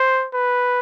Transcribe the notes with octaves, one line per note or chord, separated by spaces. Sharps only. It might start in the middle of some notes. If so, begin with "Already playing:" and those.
Already playing: C5
B4